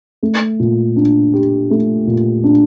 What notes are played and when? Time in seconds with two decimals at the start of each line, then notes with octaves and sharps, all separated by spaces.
0.23 A3
0.60 A#2
0.96 D4
1.33 G4
1.71 A3
2.07 A#2
2.44 D4